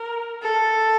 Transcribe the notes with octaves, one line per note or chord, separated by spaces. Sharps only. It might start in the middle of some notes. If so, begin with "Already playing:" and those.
Already playing: A#4
A4